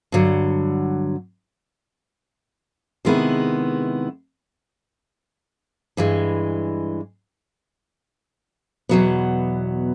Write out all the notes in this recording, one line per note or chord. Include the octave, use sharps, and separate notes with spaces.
G2 D3 F#3
C3 D#3 G#3 B3 E4
G2 E3 G#3
E2 B2 F#3 B3